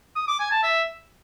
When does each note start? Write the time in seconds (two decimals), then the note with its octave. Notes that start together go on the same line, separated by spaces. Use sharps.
0.16 D#6
0.28 D6
0.39 G#5
0.51 A5
0.63 E5